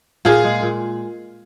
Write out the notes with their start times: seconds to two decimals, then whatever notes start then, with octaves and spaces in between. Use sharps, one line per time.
0.25 A#2 F4 G#4
0.44 G#3
0.63 A#2